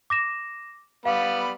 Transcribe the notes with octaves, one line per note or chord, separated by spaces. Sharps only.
D6 A#6 E7
G3 B3 F5 B5